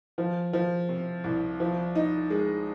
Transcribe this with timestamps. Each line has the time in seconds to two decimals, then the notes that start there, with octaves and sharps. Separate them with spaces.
0.18 F3
0.53 F3
0.89 C3
1.24 C2
1.60 F3
1.95 D#4
2.30 G#3